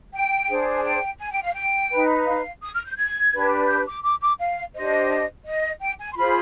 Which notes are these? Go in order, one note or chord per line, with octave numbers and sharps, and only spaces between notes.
G5
D4 G#4 C5
G#5
G5
G#5
G5
F5
G5
D#4 B4
F5
D#6
F6
G6
G#6
D4 G4 B4
G6
D6
D6
D6
F5
D4 G4 C5 D#5
D#5
G5
G#5
C6
F4 G#4 C5 B5